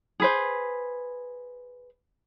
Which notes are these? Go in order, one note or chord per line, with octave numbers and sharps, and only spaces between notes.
G#4 B4 C5